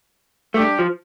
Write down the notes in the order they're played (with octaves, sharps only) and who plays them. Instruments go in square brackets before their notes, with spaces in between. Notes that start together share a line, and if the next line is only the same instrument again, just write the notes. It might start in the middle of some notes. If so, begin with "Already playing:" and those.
[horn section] G3 D4 G4 [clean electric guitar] A3
[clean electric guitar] F3